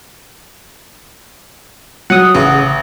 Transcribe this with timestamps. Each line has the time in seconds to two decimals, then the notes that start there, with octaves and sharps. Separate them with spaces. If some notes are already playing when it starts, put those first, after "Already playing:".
2.10 F#3 F#5 D#6
2.35 A1 C#3